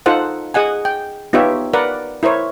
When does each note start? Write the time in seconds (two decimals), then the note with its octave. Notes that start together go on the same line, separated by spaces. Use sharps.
0.06 D#4 F4 A4 C5 F#5
0.54 G#4 D#5 F#5 G#5
0.85 G5
1.33 B3 D#4 F4 G4 C#5 E5
1.74 A#4 B4 D5 F#5
2.23 E4 A#4 C5 C#5